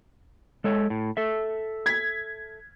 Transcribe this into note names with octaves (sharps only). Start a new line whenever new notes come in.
G#3 A4 C#5
A2
A4 E5
G#6 B6